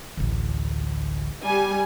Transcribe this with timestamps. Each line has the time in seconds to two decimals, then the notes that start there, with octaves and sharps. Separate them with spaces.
0.17 A1 D2
1.44 G3 G#5